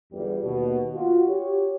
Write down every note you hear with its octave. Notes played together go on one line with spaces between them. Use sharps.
G1 E2 G3
D#2 B2
F4 F#4
G4 C#5